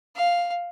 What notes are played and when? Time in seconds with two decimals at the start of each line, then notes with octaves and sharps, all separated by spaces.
0.16 F5